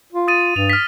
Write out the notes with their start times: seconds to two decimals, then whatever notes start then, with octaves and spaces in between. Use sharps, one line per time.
0.13 F4
0.28 D#6 A6 D#7
0.56 G2 F7
0.70 F6 B6